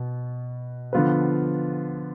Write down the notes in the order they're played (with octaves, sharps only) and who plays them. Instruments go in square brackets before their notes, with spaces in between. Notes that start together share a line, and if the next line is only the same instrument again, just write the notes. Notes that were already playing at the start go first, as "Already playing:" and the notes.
Already playing: [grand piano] B2 B3
D3 F3 B3 F4 B4